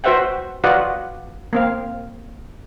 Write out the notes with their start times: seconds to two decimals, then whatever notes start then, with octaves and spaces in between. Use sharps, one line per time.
0.04 F#4 B4 C5 E5 F#5 G5
0.64 F4 F#4 B4 D5 D#5 F#5
1.53 A#3 C4 F5